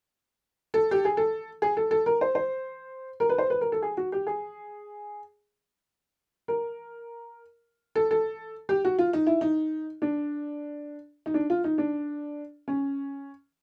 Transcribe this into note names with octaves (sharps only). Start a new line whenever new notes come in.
A4
G4
G#4
A4
G#4
A4
A4
A#4
C5
C5
A#4
B4
C5
B4
A#4
A4
G#4
F#4
G4
G#4
A#4
A4
A4
G4
F#4
F4
D#4
E4
D#4
D4
D#4
D4
F4
D#4
D4
C#4